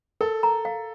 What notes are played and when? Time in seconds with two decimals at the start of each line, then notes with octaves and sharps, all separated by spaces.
0.21 A4 A#4
0.43 A#5
0.65 F5